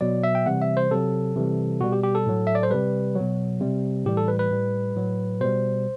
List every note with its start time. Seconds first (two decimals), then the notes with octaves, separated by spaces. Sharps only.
0.01 B2 F#3 D5
0.23 E5
0.35 G5
0.46 C3 E3 G3 F#5
0.62 E5
0.77 C5
0.91 C3 F#3 A4
1.36 C3 E3 G3
1.81 B2 G3 F#4
1.92 G4
2.03 G4
2.15 A4
2.26 A2 F#3
2.47 E5
2.55 D5
2.63 C5
2.71 C3 G3 B4
3.15 F#3
3.21 B2
3.60 C3 G3
4.05 A2 E3 G3 G4
4.17 A4
4.28 B4
4.39 B4
4.50 A2 G3
4.96 A2 F#3
5.41 B2 G3 C5